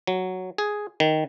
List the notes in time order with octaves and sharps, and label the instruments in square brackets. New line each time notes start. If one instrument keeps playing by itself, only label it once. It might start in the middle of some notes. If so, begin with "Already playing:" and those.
[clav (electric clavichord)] F#3
G#4
D#3